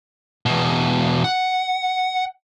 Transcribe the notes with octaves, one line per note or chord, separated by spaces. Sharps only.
E2 B2
F#5